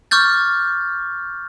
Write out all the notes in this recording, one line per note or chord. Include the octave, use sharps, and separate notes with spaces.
C#6 D6 F6 G6 A6